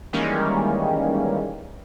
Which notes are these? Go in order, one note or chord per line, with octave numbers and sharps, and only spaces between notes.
D#3 E3 G3 G#3 A#3 C#4